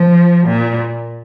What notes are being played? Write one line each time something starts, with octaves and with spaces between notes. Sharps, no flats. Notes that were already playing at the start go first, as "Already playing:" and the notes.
Already playing: F3
A#2